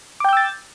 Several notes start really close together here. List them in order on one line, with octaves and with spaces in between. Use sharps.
D6 G5 G6 E6 A6